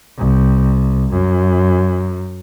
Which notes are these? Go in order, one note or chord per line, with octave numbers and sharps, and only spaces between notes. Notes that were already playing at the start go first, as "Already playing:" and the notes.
C2
F#2